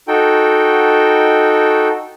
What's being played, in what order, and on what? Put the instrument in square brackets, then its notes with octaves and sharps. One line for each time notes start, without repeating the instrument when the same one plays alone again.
[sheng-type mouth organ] D#4 F#4 A4 G5